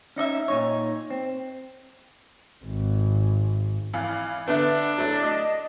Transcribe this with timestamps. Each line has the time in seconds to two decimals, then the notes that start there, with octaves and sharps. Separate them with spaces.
0.16 C#4 D#4 D#5 E5
0.48 A#2 D#4 C#5
1.10 C4
2.64 G#1
3.94 G#1 E3 F5
4.48 D3 B3 D4 B4 E5
4.98 F#3 A3 E4
5.22 D#5 D#6